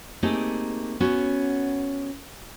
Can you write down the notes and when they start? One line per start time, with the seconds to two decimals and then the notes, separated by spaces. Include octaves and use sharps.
0.23 A3 A#3 C4 D#4 G4 G#4
1.00 B3 C#4 F#4